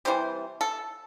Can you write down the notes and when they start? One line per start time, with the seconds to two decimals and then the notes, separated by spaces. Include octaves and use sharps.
0.05 C3 E3 G3 C5
0.61 A4